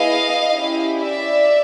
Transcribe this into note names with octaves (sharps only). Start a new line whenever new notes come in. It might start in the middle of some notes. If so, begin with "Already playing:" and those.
Already playing: B3 E4 G#4 D#5 F5
C#4 E4 G4
D5 E5